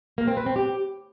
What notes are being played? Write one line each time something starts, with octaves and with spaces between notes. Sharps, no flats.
A#3
C4
B4
C4
G4